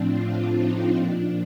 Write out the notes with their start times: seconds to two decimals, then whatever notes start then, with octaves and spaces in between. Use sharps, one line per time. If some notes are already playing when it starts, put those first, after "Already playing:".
Already playing: A2 F3 C4 D4
0.15 F4
0.55 D#4
0.94 A#2 F3 D4